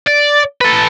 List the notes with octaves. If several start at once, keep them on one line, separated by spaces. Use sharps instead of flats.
D5
A4 B4